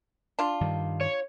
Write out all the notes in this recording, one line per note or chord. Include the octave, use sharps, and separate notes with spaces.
D4 F4
G2 D#3 G3
C#5